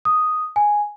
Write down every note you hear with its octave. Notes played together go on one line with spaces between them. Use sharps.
D#6
G#5